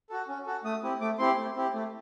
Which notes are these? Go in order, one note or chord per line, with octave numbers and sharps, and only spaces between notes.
F#4 A4
C#4
F#4 A4
A3 D#6
C4 E4 G4
A3 D6
C4 E4 G4 C6
A3
C4 E4 G4
A3